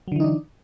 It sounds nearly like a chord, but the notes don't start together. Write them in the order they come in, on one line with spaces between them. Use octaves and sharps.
F#3 D3 E3 D#4 D4